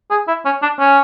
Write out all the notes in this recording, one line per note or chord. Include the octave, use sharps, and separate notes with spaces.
G#4
E4
C#4
D4
C#4